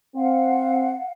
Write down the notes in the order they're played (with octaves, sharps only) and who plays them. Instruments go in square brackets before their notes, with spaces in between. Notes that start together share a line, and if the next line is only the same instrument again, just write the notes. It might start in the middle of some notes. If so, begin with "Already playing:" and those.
[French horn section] C4 [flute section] F5 F#5